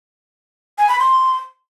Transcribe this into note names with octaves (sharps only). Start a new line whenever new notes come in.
G#5
B5
C6